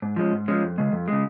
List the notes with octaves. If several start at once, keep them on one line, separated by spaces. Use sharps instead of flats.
G#2
F3 G#3 C#4
G#2
F3 G#3 C#4
F2
C#3 G#3
F2
C#3 G#3